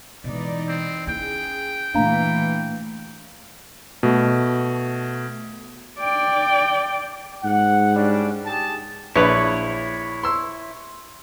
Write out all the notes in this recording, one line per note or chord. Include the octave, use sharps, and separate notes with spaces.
B2 E3 G#3 D#4 D5
C4
C#4 E4 G#4 G5
A#2 E3 A3 D4 F5 A#5
B2 A3
D5 G5
G#2 F#5
G3 C#4 D4
G4 G#4 A5
A#1 E4 B4 C#5
C6 E6